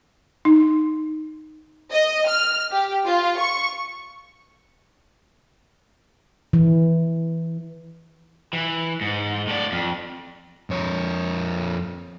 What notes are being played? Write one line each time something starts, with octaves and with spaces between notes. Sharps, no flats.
D#4
D#5
F6
G4
F4
C#6
E3
E3
G#2
A2 D5
F2
F2 C#5